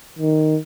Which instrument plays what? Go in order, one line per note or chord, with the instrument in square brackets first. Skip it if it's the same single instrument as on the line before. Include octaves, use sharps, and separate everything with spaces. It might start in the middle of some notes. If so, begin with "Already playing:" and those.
[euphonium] D#3